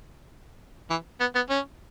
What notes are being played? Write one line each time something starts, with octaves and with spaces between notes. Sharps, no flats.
E3
B3
B3
C#4